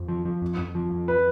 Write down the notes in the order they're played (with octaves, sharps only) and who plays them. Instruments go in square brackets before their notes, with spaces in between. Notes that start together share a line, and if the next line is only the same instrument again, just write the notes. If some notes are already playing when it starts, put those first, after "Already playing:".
Already playing: [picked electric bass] F2
F3
F3
F2
F2
F3
F2
[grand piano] B4